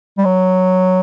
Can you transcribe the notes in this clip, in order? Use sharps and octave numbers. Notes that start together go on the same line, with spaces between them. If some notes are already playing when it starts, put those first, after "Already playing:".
G3
F#3